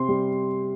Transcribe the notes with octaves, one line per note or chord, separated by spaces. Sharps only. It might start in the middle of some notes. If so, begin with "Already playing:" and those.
Already playing: C3 C4 C6
G3